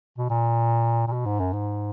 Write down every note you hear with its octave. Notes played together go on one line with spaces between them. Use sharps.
B2
A#2
A#2
B2
G#2
F#2
G#2